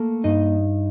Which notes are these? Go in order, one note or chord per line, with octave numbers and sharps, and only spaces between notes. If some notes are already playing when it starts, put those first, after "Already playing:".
Already playing: A3 A#3 A4
G2 D#4 D#5